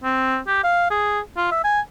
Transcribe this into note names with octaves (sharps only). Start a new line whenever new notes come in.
C4
G4
F5
G#4
F4
E5
G#5